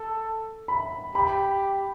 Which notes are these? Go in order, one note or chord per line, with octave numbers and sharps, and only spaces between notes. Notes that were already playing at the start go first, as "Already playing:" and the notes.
Already playing: A4
B5
G4 B5